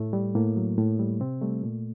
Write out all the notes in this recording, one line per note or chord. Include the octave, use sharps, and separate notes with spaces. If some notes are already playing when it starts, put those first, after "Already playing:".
Already playing: A2 A3
G3
A2 A#3
F#3
A2
G3
C3 C4
G3 A3
A#2